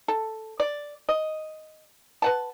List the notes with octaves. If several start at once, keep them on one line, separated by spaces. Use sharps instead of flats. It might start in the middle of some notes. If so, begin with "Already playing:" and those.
A4
D5
D#5
B4 F#5 A5